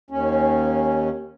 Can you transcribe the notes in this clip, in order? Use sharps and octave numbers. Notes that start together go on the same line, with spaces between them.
D#2 C#4